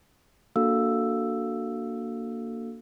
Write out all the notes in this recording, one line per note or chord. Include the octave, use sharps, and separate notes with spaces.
A#3 D4 F#4 A4 F5 E6